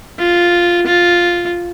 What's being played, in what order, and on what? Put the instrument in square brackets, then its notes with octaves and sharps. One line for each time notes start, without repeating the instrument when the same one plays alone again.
[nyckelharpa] F4
F4